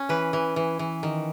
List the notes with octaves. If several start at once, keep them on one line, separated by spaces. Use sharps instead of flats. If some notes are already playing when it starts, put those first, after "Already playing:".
Already playing: C#4
E3 B4
E3
E3
E3
D#3